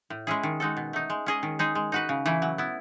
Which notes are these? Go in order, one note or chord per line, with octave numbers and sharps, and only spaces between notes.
A2
G#3 C#4 E4 G#4
D#3
G#3 D#4 F#4 A4
B2
A3 D#4
G#3
C#4 G#4 D#5
D#3
G#3 D#4 G#4
G#3
D#4 F#4 B4
C#3
E3 A3 E4
F#3
B3 E4